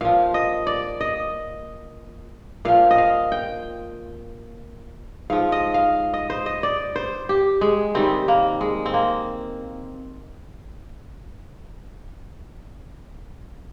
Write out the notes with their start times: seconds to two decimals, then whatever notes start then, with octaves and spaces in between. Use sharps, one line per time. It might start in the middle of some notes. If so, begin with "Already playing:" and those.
0.01 A#2 F3 F5
0.34 D#5
0.67 D5
1.01 D#5
2.65 A#2 F3 F5
2.91 D#5
2.98 F5
3.32 G5
5.30 G#2 F3 F5
5.52 D#5
5.74 F5
6.14 D#5
6.30 C5
6.46 D#5
6.63 D5
6.96 C5
7.29 G4
7.61 G#3
7.94 C3 D#3 G3 C4
8.28 A#3
8.61 G#3
8.86 C4
8.94 A#3